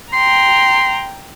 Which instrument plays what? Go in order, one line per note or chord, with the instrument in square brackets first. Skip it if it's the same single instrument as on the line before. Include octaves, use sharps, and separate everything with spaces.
[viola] G5 A#5 [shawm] C6